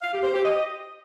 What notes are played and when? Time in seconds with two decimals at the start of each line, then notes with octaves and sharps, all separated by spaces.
0.02 F5
0.12 G4
0.23 C5
0.34 G4
0.44 D#5